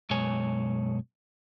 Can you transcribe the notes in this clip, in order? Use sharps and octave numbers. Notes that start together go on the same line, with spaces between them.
F#2 B2 G#3 C#5 G#5